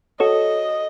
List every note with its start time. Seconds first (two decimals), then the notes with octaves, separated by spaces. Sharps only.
0.20 F#4 A4 C#5 D#5